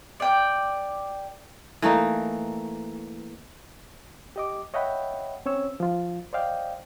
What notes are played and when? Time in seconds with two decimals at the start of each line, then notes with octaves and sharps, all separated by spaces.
0.20 D5 G5
1.82 E3 A3 A#3 D#4
4.36 G4 D#5 D6
4.74 C#5 D#5 E5 F#5 G5 B5
5.46 C4 C#4 C#5 E6
5.80 F3 F4
6.33 C5 D5 D#5 F5 G5